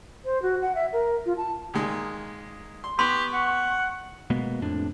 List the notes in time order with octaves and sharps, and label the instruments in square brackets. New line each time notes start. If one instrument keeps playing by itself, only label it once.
[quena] C5
F#4
F#5
E5
A#4
F4
A5
[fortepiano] A#2 D#3 G#3
C6
[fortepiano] B3 [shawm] G4 [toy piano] C6 [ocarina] C#6
[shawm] F#5
[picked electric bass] B2 G#3 A#3 B3
F2 A2 C3 D4